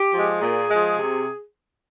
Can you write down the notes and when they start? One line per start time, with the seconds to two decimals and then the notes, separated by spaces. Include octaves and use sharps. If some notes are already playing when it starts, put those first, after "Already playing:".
Already playing: G4
0.12 F3 G#3
0.40 A#2 G#4
0.69 F3 G#3
0.97 C3